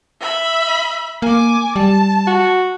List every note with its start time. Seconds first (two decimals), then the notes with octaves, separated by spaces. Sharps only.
0.20 E5 B5
1.22 A#3 G#5 D6
1.76 G3 A5
2.27 F#4